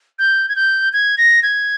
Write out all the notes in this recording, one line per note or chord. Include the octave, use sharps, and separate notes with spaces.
G6
G#6
G6
G#6
A#6
G#6